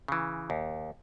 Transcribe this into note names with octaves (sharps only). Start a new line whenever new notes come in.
C#3 E3
D#2